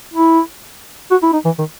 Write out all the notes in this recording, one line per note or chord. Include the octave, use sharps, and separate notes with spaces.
E4
F#4
E4
D#4
E3
D#3